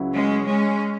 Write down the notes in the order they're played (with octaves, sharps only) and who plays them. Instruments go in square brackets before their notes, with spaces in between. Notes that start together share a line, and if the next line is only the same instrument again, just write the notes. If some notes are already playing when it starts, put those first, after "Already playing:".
Already playing: [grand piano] C#2 C#3 F#3 E4
[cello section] G#3 C#4
G#3 C#4